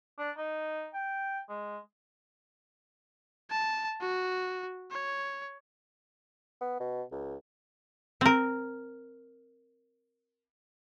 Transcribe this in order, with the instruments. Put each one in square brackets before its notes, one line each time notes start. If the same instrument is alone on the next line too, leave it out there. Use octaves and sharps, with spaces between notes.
[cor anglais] D4
D#4
G5
G#3
[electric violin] A5
F#4
C#5
[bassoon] B3
B2
C#2
[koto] C4 A#4